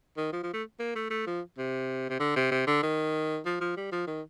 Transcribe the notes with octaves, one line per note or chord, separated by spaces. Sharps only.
D#3
F3
F3
A3
A#3
A3
A3
F3
C3
C3
D3
C3
C3
D3
D#3
F3
F3
G3
F3
D#3